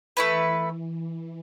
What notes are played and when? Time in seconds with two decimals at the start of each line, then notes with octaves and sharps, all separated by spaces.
0.17 E3 A3 E4 B4